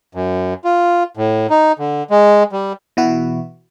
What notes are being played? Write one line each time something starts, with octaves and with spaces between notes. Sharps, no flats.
F#2
F4
A2
D#4
D3
G#3
G3
B2 E3 E4 F#4